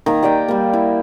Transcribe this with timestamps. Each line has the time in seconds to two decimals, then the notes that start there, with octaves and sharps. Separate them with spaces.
0.06 D#3 A#3 A#5
0.23 G4 D5 D#5 G5
0.48 G3 A#3
0.73 E4